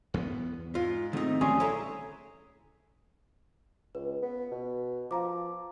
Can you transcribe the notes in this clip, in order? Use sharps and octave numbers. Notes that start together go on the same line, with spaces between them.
E2 B3
G#2 F4
E2 D#3 A3 C4 D#4
A#1 D3 F#3 G3 A3 C#4 G#4 C6
E3 A4 C#5 E5 A#5
C#2 B4
B3
B2
F3 F5 A#5 D6